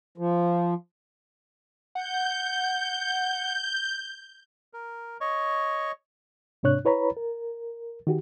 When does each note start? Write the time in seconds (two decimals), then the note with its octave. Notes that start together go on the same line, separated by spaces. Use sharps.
0.18 F3
1.95 F#5 G6
4.74 A#4
5.21 C#5 D#5 C#6
6.63 G#2 C3 D4 C#5 F#6
6.85 E4 B4 C#5 A#5 B5
7.17 A#4
8.07 D#3 F#4 G4